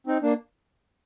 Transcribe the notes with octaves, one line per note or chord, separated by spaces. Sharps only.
C4 D#4
A#3 D4